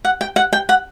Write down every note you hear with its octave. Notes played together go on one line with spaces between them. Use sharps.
F#5
G5
F#5
G5
F#5